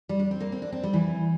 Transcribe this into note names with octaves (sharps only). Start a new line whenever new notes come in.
G3
D4
C4
A#3
C4
D4
C4
G3
E3